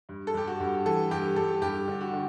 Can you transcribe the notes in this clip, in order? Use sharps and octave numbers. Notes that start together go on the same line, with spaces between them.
G2
A4
G2 G4
F#4
G2
E3 A4
G2 G4
G2 A4
G2 G4
D3
F#4
D3